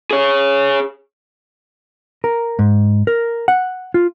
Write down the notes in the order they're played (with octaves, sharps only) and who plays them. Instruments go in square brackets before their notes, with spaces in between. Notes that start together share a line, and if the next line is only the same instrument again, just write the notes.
[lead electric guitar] G#4 C#5
[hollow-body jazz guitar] A#4
G#2
A#4
F#5
F4